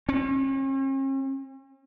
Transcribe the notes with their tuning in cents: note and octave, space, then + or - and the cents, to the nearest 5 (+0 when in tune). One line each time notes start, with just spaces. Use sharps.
C#4 -45